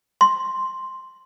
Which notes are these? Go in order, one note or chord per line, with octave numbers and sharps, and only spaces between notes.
C6